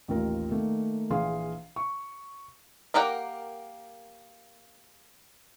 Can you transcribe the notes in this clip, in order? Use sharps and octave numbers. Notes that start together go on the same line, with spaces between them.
A1 D#2 F4 A#4
D#3 A3 A#3
A#1 E3 G#4 F5 C6
C#6
A#3 G4 A#4 F#5 G5